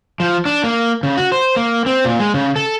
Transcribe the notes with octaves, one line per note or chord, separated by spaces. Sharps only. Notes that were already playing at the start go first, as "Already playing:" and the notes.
F3
D4
A#3
C#3
F#4
C5
A#3
C4
A#2
G#3
C#3
A4